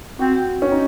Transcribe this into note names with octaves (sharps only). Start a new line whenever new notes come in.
C4 F#4
C#4
D#4